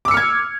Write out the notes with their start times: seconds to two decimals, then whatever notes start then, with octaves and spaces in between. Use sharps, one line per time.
0.05 D6
0.08 E6
0.11 C#7
0.14 F6
0.17 G#6